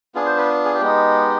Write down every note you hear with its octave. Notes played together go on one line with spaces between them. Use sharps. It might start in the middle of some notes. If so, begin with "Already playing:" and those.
B3 D4 F4 G#4
C5
B4
G#4
G4
G#3 B3 D#4